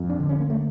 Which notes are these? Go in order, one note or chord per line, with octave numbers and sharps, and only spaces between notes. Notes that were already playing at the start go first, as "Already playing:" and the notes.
Already playing: F2
D4
D3
C#4
A#3
A3